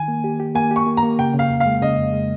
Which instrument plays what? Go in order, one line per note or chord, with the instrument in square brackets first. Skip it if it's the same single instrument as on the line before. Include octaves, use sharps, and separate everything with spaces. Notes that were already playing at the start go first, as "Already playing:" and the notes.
Already playing: [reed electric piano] D#3 [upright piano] G#5
[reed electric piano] A#3
G4
G4
[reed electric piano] A#3 [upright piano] G#5
[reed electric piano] G4
[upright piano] C#6
[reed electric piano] A#3
[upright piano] A#5
[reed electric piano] A#3
[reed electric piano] C#3 [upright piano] G5
[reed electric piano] C#3 [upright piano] F5
[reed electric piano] F2
[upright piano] F5
[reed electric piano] G#3
[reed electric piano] C#3 [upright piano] D#5
[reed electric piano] F2
G#3